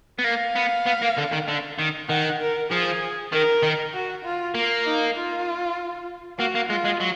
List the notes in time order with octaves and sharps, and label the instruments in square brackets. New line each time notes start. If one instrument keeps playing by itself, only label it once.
[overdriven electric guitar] B3
[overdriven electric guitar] A#3 [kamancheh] F5
[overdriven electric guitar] B3
B3
A#3
D3
D#3
D3
D#3
[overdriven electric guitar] D#3 [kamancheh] F#5
[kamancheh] A#4
[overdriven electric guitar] F3 [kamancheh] G#4
[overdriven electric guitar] D#3 [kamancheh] A#4
[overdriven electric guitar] D#3
[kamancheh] F#4
F4
[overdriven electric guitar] A#3
[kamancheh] D#4
F4
[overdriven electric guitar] A#3 [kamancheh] F#4
[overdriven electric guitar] A#3
[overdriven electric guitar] G#3 [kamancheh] F4
[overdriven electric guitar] G#3
F#3